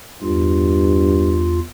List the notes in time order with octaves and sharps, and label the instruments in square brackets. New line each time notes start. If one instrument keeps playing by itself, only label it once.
[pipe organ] E2 F4 [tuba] G2